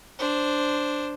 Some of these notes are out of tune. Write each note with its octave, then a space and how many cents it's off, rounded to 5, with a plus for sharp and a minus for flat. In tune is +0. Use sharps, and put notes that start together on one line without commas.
D4 +0 C5 +0